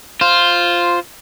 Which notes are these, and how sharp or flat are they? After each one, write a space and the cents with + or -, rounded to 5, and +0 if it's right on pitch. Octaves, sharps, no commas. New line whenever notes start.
F4 +0 C5 +0